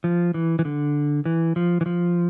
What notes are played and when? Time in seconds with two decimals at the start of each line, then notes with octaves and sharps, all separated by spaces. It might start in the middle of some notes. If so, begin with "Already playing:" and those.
0.04 F3
0.34 E3
0.59 E3
0.65 D3
1.25 E3
1.56 F3
1.81 E3
1.86 F3